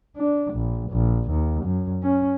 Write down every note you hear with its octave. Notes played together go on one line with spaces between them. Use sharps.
D4
A#1
A#1
D#2
F#2
C#4